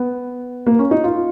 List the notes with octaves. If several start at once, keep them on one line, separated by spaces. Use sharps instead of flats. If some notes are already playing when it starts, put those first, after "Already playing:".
Already playing: B3
A#3
C#4
D#4
F4